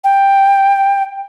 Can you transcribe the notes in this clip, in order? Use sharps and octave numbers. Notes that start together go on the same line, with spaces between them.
G5